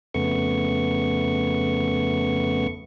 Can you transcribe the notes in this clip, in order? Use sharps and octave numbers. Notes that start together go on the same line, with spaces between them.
F2 C#3 A3 B3 C#6